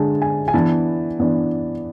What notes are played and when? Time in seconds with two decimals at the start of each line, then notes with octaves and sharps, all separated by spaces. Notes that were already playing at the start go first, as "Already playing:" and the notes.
Already playing: D3 G#3 D4 G#5 A5
0.22 G#5
0.48 G#5
0.53 E3 B3 D4 A5
1.20 E3 B3 D4